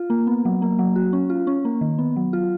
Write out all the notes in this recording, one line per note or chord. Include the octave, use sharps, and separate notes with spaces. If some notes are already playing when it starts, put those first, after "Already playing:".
Already playing: F4
A#3
B3
F#3
A#3
F#3
F#4
C#4
F4
C#4
A#3
D#3
B3
F#3
F4